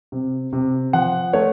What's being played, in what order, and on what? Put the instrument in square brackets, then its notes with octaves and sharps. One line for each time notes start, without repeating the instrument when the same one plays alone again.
[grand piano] C3
C3
F3 F#5
A3 C#5